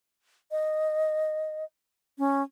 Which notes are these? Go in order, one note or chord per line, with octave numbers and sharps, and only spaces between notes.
D#5
C#4